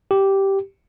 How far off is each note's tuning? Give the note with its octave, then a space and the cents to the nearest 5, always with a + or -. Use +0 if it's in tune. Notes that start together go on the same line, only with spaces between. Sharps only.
G4 -5